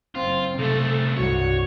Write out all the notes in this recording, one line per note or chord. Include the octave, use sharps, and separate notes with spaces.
F#1 C4 F4
C2 C3 A3 A4
C2 G2 F#4 C#5